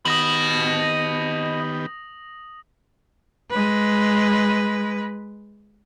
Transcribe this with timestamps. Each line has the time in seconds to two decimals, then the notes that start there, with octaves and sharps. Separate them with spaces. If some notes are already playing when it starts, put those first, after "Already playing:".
0.05 D#3 B3 G4 D#5 B5 D#6 A#6 F#7
3.51 G#3 B4